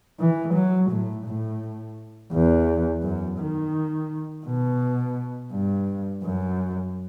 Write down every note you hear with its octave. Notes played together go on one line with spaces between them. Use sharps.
E3
F#3
A2
A2
E2
F#2
D#3
B2
G2
F#2